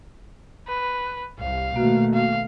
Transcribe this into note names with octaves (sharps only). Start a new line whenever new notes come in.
B4
C2 F5
B2 D#3 A3 A#3 F#4
F5